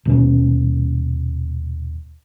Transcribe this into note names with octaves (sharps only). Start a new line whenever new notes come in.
D#1 B2 C#4